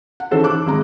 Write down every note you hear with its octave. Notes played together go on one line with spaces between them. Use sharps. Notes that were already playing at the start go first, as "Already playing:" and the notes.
F#5
D#3 E3 C#4 A4 C5
D6 F#6
G#1 G#3 A#5